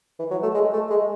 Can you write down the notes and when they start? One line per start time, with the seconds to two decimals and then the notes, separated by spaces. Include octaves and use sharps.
0.19 E3
0.31 F#3
0.43 A3
0.54 G#3
0.73 A3
0.90 G#3